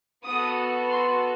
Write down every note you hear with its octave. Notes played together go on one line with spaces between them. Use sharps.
B3 F#4 A4 D#6
C6